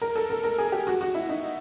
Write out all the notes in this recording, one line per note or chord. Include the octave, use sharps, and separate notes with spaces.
A#4
A4
A#4
A#4
G#4
G4
F#4
F#4
E4
D#4